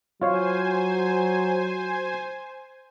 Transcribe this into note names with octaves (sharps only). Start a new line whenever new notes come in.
F#3 F4 C5 C#5 F5 G#5